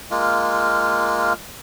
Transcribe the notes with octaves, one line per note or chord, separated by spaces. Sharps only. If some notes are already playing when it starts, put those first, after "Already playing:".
G#3 A#3 F4